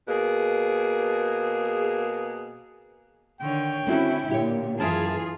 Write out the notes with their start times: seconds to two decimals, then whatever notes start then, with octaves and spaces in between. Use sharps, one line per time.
0.08 B2 A#3 G#4
3.41 D3 D#3 C#5 G5
3.87 D3 A3 C4 C#4 E4 F#4
4.31 A#2 G4 C#5
4.80 F#2 E3 F4 G#4 A#4 E5 A5